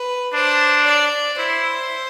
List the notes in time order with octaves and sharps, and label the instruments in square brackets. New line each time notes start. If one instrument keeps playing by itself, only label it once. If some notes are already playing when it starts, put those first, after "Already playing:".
Already playing: [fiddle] B4
[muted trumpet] D4 [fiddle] C5
[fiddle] D5
[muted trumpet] E4 [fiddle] C5